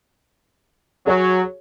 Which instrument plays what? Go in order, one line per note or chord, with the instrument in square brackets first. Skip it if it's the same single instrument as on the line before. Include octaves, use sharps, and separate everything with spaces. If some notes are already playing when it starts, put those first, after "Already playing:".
[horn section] F#3 [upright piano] F#4 G#4 C#5